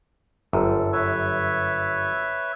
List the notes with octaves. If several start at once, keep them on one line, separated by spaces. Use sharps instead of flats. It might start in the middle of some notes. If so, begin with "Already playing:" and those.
G1 F#2 A4
B4 C#5 E5